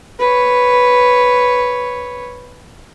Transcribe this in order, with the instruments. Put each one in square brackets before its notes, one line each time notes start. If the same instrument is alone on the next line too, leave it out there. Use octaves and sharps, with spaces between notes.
[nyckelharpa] B4 C#5